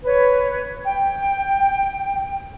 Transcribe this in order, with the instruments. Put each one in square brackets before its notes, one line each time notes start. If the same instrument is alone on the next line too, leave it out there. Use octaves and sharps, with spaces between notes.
[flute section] B4 C#5
G5